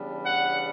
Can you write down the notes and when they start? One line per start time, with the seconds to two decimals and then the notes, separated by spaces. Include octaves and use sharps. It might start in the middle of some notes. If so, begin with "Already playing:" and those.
Already playing: C#3 E3 G3 B3 D4
0.23 F#5